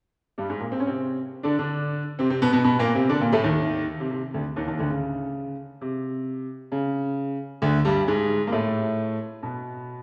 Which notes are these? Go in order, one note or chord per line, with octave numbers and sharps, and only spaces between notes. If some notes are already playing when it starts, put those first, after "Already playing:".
G2 G3
G#2 G#3
A#2 A#3
C4
C#4
C3 C4
D3 D4
D3 D4
C3 C4
C3 C4
B2 B3
B2 B3
B2 B3
A#2 A#3
C3 C4
D3 D4
A#2 A#3
A2 A3
D#2 D#3
C3
C3
D2 D3
D#2 D#3
D#2 D#3
D2 D3
C#3
C3
C#3
D2 D3
G2 G3
G#2 G#3
A#3
A2 A3
B2 B3